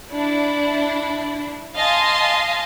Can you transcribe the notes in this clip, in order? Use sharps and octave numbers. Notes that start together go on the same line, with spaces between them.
D4 E4
D#5 F5 G#5 A5 C6